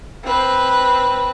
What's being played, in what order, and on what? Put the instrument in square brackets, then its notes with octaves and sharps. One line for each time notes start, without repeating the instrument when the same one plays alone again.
[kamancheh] C4 B4